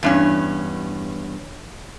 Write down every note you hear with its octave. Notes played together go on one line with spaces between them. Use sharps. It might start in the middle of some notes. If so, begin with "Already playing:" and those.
E2 G2 C#4